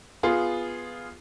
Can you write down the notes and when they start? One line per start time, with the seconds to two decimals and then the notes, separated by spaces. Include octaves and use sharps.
0.23 B3 F4 G#4